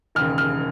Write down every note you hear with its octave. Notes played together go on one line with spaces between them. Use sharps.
E1 D#2 C#3 F6
F6